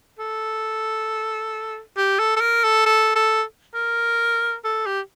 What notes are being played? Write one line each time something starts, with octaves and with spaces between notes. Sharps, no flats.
A4
G4
A4
A4
A#4
A4
A4
A4
A#4
A4
G4